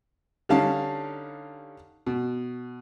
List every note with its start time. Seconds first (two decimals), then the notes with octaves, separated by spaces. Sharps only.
0.49 D3 G3 C#4 D#4 F5 A5
2.06 B2